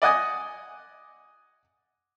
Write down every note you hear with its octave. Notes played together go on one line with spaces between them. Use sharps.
D5 D#5 F#5 G#5 D#6